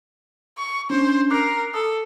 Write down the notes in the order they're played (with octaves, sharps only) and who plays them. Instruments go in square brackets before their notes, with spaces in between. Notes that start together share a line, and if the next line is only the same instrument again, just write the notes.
[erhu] C#6
[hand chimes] C#4 D4 [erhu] C5
[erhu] A#4 [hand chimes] D6 F#6 C7
[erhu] A4 [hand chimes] D#6